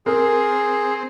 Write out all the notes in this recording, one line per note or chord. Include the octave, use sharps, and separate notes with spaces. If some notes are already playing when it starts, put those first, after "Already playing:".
C4 G#4 A#4